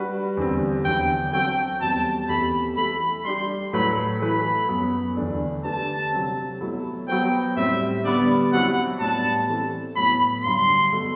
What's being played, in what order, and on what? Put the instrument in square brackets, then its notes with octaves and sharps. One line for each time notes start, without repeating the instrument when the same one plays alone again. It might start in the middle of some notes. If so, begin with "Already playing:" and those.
Already playing: [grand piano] G3 D4 F#4 B4
E2 D3 G3 C4
[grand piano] E2 D3 F#3 [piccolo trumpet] G5
[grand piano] F#3 C4 F#4 A4 [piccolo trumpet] G5
[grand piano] E2 B2 G3 C4 [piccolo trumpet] A5
[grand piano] E2 B2 A3 C4 G4 [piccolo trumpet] B5
[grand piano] E3 A3 E4 A4 [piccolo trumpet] B5
[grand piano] G3 D4 G4 [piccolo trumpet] C6
[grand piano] A2 F#3 A3 E4 B4 [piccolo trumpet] B5
[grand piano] E3 A3 E4 B4 [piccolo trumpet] B5
[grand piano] F#2 F#3 B3
E2 D3 A3 D4
[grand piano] D3 A3 D4 G4 B4 [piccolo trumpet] A5
[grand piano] C3 F#3 C4
B2 F#3 A3 E4
[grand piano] F#3 B3 F#4 A4 C5 [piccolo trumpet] G5
[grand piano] A2 G3 C4 [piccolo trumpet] E5
[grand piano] D3 G3 B3 [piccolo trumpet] D5
[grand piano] B2 F#3 C4 E4 [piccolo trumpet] F#5
[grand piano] A2 G3 B3 D4 [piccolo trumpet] A5
[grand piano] E3 A3 C4
[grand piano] A2 F#3 B3 E4 [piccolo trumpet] B5
[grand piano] G2 D3 F#3 [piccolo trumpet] C6
[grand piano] B2 A3